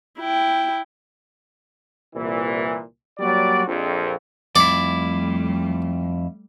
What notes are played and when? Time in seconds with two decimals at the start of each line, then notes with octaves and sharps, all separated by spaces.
0.20 E4 G5
2.14 C2 A#2 E3
3.19 F#3 G3 A#3 F#4 D5
3.67 A#1 F2
4.56 F2 G3 A3 E4 D5